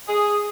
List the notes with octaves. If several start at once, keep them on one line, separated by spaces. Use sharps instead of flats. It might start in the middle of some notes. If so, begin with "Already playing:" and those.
G#4